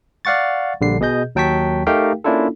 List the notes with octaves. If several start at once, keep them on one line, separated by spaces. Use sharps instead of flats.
D5 F5 F#5 C#6 A6
A#1 D3 G3 C7
B2 G#4 D#5 G6
D#2 F#3 G5 A5 C#6 B6
A3 D#4 G4 A#4 F5 G5
A#3 C#4 D4 E4 F4 A4